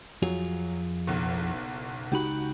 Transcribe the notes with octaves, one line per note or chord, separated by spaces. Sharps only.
F2 F#3 F4 G#4
F#1 B1
C#2 D#4 F#4 G4 B5